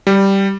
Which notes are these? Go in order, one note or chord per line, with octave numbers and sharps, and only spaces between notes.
G3